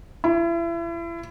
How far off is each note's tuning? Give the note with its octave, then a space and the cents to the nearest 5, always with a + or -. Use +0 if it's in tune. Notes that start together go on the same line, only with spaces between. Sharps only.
E4 +35